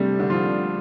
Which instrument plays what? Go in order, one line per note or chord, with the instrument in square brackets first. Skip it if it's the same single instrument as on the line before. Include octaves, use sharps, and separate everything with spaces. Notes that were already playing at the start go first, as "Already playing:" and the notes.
Already playing: [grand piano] C3 G3 [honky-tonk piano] A3 C4 D4
[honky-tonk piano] D3
[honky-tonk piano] F3 [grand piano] F4